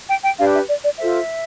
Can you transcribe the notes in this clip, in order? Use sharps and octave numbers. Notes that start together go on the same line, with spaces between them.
G5
G5
D4 G4 B4 F5
E5
D5
D5
F4 A4 C5 E5